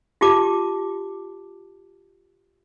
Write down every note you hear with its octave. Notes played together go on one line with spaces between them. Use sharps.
F4 G4 A5 D6